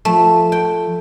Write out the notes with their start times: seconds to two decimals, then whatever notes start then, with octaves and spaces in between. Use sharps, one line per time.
0.05 F3 A3
0.52 G5